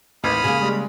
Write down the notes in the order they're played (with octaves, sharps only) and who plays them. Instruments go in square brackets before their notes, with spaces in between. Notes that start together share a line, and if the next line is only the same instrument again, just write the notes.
[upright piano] A1 [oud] D#2 [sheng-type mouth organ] B5 D#6 F6
[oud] C#3 A#3 [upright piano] G#4
[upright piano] G3 G#3